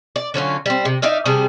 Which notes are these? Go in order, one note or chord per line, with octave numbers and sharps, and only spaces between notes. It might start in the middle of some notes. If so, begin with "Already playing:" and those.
D5
D3 F#3 C#4 F4
G3 C4
C3
D#4 D5 E5 F5
C3 G3 G#4 A4